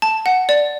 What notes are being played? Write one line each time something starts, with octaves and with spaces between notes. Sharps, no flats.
A5
F#5
D5